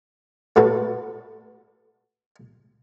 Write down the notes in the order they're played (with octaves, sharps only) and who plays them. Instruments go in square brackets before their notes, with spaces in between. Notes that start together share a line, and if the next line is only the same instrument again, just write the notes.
[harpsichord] A2 F#4 A4 B4